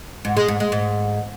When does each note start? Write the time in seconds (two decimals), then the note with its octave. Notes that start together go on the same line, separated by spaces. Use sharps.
0.25 G#2
0.37 G#3
0.48 G#2
0.60 G#3
0.72 G#2